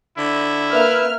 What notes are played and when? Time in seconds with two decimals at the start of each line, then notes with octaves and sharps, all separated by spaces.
0.17 D3 E4
0.73 A#3 B4 E5 F6